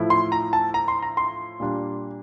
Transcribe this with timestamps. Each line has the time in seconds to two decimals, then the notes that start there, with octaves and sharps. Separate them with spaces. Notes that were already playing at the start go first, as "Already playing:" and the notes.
Already playing: A2 F3 A3 E4
0.10 C6
0.32 A#5
0.53 A5
0.74 A#5
0.88 C6
1.03 A#5
1.17 C6
1.60 A#2 G3 A#3 D4